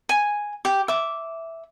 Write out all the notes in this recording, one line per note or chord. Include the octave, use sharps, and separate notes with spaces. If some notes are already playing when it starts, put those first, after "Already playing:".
G#5
G4
E5 D6